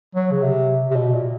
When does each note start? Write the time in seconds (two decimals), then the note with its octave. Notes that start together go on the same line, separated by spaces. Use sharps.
0.15 F#3
0.32 C#3
0.42 C3
0.91 C3
0.96 B2
1.14 A#2